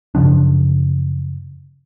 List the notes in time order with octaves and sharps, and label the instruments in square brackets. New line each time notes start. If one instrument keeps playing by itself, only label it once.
[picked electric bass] F#2 C#3 F3 D4